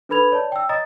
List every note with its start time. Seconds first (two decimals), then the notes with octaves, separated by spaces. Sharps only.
0.09 D4 A4 B4 B5 G#6 F7
0.32 C#5 D5 A5
0.52 G5 E6
0.69 C#5 D#5 A#5 D#6 A6